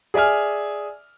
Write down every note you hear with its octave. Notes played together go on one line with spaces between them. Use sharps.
G#4 D5 E5 G#5 F6